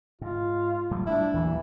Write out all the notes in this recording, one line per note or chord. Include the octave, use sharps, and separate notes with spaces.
G#2 F4
A2 F#3 G3
G3 A3 D4 E4
D#2 A#2 E3 F#3